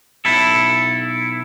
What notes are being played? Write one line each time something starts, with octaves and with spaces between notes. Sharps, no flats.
B1 E4 A4